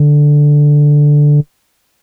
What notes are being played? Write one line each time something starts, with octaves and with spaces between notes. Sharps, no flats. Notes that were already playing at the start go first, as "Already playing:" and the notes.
Already playing: D3